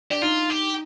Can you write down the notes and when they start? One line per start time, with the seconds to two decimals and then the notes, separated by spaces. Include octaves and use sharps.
0.11 D4 G4
0.22 D#4 F4
0.50 G4